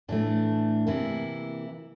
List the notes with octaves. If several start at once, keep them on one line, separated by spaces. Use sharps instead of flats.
A2 E3 A3 D4
C3 E3 A#3 E4